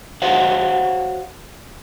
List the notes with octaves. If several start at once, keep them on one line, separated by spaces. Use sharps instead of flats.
F#4 C5 C#5 F5 F#5